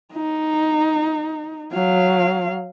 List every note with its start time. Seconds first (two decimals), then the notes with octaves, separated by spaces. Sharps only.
0.14 D#4
1.73 F#3 F5